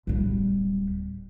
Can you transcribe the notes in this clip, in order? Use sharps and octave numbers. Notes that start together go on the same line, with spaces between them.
D1 G3